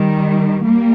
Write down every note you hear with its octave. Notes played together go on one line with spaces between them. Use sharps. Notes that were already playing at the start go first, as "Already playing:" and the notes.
Already playing: D#3 G3
G3 A#3